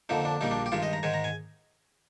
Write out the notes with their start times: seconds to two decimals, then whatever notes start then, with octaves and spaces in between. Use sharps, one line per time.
0.09 F2 D3 F3 A#3 D#4
0.25 D4
0.41 A#1 A#2 G3 A#3 D#4
0.51 D4
0.66 G4
0.72 G2 D#3 G#3 F4
0.83 D#5
0.93 A#5
1.03 G#2 D#3 G#3 G#5
1.14 A#5
1.24 G#5